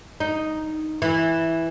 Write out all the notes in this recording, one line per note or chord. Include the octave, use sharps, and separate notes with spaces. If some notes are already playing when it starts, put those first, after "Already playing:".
D#4
E3